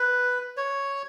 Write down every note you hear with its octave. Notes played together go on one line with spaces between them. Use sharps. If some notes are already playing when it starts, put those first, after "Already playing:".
Already playing: B4
C#5